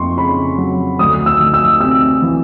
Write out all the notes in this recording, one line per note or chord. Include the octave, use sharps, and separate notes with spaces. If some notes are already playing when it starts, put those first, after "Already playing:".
Already playing: F2 A#3 C6 C#6
C#3 B5
F#3
D2 D#6
E6
D2
E6
C3 E6
E3